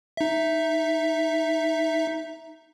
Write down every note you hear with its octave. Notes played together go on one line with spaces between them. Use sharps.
D#4 E5